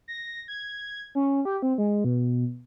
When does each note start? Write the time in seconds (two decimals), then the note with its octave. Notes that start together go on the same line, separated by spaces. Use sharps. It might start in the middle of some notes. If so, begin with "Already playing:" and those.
0.08 A#6
0.48 G#6
1.15 C#4
1.45 G4
1.62 C4
1.78 G#3
2.05 B2